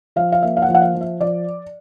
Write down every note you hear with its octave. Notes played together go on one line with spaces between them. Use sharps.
F3 F5
F5
A#3 E5
F5
F#5
F3
F#5
F5
F3
E5
F3 D5